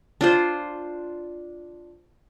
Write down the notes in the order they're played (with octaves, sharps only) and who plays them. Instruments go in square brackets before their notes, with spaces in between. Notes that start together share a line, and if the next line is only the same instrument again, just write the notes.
[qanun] D4 F4 C5